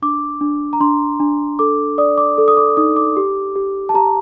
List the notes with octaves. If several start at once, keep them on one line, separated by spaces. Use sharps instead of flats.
D4 D6
D4
A#5
D4 C6
D4
A4 D6
D5 D#6
D6
A4
D#6
D6
D#4 D#6
D6
G4
G4
A5
G4 A#5